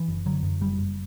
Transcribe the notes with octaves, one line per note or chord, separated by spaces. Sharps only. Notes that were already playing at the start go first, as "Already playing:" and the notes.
Already playing: E3
F#1
D3 F#3
F#2
F#1 G3
F#1